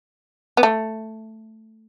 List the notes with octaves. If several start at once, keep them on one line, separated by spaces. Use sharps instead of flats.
B3
A3